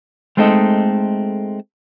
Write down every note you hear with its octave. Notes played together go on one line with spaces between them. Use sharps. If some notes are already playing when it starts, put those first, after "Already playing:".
G#3 A3 C4 D#4 A4 D#5